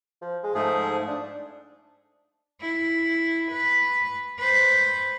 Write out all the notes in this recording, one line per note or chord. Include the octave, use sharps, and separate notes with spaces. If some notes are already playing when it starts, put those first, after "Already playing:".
F3
G#3
G#2 F3 A3 G#4
D4
E4
B4
B4 C5